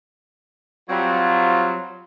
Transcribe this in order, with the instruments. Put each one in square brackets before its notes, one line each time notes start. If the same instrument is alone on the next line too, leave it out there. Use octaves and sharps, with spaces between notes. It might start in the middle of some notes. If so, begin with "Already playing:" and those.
[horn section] F#3 G3 C4 [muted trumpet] F4